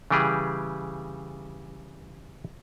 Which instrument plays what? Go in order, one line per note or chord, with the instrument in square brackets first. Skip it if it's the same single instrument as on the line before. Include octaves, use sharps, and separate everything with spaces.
[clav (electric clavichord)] C#3 E3 G3 G4 G#4